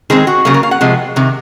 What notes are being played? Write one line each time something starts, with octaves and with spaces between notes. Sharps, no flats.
D#3 G#3 C4 G#4
F#4
C#3 F#3 A#3 G#4
A#4
F5
F#5
C3 F3 G#3
C3 D#3